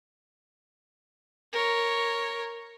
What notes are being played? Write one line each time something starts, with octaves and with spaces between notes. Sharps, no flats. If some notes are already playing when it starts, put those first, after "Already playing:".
A#4 C#5